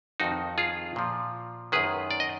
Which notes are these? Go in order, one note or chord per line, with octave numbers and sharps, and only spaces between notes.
F2 D#3 D#4 F#4
F4 G#4
A#2 F3
F#2 D#3 G#4 B4
D5
D#5